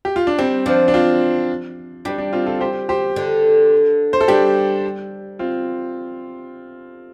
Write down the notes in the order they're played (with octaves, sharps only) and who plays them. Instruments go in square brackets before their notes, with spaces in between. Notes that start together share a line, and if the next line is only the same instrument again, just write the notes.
[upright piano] G4
F4
D4
[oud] G3 [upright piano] C4
[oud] F3 [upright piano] D4
[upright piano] D4
C4 F4
[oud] G3 [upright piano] D4 G4
[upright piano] D4
C4 F4
F4 A4
G4 C5
G4 C5
[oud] D3
[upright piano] C5
A4
[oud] G3 [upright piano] D4 G4
[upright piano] C4 F4